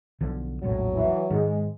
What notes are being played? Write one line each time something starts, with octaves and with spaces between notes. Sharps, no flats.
B1 D3 F3
E1 A#1 A2 F#3
E3
G#2 D#3 G#3